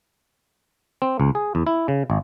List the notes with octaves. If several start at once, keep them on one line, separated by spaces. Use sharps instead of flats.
C4
C#2
G#4
E2
E4
C#3
G#1